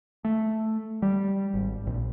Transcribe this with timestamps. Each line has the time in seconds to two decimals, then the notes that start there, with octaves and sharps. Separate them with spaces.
0.25 A3
1.02 G3
1.54 G#1
1.86 A#1